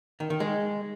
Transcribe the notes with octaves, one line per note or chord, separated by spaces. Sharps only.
D#3
D#3
G#3